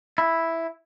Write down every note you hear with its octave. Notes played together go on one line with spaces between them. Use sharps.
E4